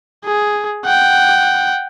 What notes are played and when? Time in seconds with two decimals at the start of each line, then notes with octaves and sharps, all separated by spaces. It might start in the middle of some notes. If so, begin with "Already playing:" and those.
0.25 G#4
0.85 F#5 G5